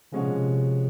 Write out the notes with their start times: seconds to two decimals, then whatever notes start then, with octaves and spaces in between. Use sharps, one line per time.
0.12 C3 F3 G#3 C#4 F#4
0.21 A#2
0.29 C3